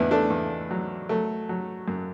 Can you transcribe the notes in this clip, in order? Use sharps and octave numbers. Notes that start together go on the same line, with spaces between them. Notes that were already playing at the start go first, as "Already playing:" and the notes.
Already playing: E2 B3 D4 E4
A3 D4
E2
F#3
F#3 A3
F#3
F#2